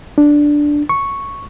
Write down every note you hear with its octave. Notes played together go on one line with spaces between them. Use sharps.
D4
C#6